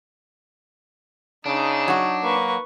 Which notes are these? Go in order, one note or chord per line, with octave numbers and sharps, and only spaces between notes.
C#3 D4 D#4
F#3 F#4
A#3 B4 C#6